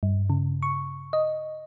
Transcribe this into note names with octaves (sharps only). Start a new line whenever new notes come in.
G2
C#3
C#6
D#5